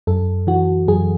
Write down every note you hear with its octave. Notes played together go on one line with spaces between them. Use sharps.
F#2 A4
E3 F#4
F#2 G#4